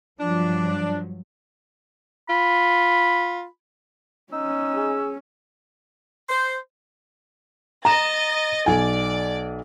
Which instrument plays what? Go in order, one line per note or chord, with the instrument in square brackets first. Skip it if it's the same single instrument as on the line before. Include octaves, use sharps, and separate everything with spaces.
[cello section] G2 F3 F#3 [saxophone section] D4
[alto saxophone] F4 [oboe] B5
[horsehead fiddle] C#4 [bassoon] D#4 [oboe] E6
[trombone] G#4
[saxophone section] C5
[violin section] D#5 A6 [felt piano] A#5 E7
[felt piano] B1 G#5 [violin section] D5